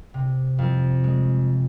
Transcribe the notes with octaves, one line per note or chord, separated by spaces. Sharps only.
C3
F2
G#3